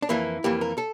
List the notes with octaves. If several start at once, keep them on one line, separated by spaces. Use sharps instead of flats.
D4
F2 E3 A#3 E4
F2 E3 A#3 G4
A#4
A4